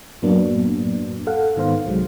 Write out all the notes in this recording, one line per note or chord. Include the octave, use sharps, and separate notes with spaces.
F#2 A2 F#3 A#3 B3 D4
A4 F5 F#5
G#2 D#3 B3 C5 F5
C2 F#3 G#3